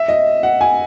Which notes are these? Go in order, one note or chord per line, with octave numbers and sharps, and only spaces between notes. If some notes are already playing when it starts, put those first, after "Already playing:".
Already playing: E5
D#5
F#5
G#5